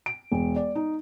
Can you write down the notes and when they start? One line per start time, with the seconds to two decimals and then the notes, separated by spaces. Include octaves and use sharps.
0.06 D7
0.32 E1
0.56 D5
0.75 D#4